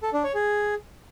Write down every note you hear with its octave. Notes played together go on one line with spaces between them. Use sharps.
A4
D4
C#5
G#4